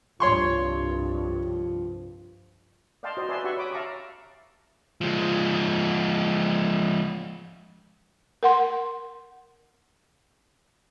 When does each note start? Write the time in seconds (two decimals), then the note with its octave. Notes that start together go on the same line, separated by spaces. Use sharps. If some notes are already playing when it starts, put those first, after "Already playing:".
0.20 C2 G2 F3 C#5 C6 C#6
3.03 D5 D#5 F5 G5 A5 C6
3.17 F#4 C5 D#5 C6
3.29 B4 D5 E5 G#5 A5 C6
3.44 F#4 G4 E5 F#5 C#6
3.57 C#5 B5 D6 D#6
3.73 E5 F5 A5 A#5 C#6 D6
5.01 F3 G#3
8.43 A#4 F#5 C6